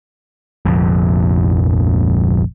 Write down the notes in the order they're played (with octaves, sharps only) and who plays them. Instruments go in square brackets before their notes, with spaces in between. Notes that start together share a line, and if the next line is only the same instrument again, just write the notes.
[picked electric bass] F1 A#1 F2